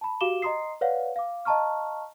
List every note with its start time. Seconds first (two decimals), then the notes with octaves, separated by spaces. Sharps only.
0.01 A5 B5
0.21 F#4 G4 F5 D6 E7 G7
0.42 D#5 A#5 C6 D#6 C7
0.81 B4 C#5 D5 F5 F#5
1.16 F5 D6
1.45 D#5 F5 A5 A#5 C#6 F6